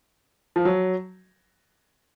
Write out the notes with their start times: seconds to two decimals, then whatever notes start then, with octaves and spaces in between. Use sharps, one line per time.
0.56 F3
0.65 F#3